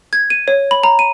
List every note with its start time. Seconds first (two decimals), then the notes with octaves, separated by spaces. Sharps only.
0.13 G#6
0.30 D#7
0.48 C#5
0.71 B5
0.84 A#5
0.99 D#7